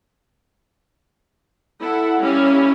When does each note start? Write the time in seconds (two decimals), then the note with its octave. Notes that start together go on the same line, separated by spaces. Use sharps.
1.79 E4 A4 F#5
2.19 G3 A#3 C#4 E4